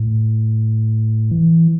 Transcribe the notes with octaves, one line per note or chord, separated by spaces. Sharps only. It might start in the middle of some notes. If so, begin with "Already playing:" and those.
Already playing: A2
E3